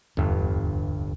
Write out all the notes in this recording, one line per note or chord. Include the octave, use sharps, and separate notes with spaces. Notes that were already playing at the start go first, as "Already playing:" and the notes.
D1 G1 E2 G2 D4